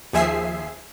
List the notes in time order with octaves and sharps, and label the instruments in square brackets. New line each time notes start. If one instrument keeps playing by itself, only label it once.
[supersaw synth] D#2 F3 G#4 E5 G#5 C7